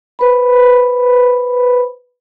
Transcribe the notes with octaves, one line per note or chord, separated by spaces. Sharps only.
B4 C5 B5